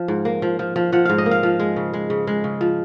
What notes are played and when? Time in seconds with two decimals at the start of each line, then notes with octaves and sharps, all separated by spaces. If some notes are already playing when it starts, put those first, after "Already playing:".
Already playing: F3
0.08 G#2
0.25 A#3
0.42 F3
0.59 F3
0.76 F3
0.92 F3 F#5
1.05 G#2 F5
1.18 D#5
1.26 A#3
1.31 F5
1.43 F3
1.60 G#3
1.76 C#3
1.93 G#3
2.10 C#3
2.27 G#3
2.44 C#3
2.61 F3